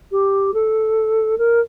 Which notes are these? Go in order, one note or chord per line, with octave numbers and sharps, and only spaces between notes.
G4
A4
A#4